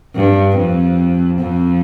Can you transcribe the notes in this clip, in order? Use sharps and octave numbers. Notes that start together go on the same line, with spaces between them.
G2
F2
F2